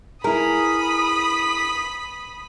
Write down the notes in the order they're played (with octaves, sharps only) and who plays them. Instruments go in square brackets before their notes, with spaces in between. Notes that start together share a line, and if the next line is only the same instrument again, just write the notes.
[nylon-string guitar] E4 G#4 [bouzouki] A#4 [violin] B5 D#6